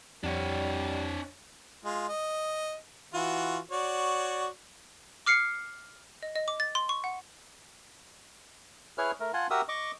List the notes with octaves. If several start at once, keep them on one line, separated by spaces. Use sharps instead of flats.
F2 G3 D4 C#5 F#5
G#3 F4
D#5
E3 F4 F#4
F#4 C#5 D5
D6 F6 C7 C#7
D#5
D#5
D6
A6
C6
C#6
F#5
E4 G#4 B4 C#5 F6
A3 A#4
F4 F#5 G#5 A5 C6
F#4 G4 A#4 E5 D#6 E6
D#5 C#6 D6